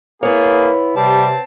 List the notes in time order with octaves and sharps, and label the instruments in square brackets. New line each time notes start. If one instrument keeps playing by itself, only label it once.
[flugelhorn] A#3 [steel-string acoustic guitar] B3 C#5 [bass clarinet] E4 [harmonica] G#4
[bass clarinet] C3 [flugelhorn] G3 [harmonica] C4 A5